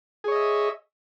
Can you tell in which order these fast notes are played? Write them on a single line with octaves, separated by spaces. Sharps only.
G#4 C#5 D#5 E5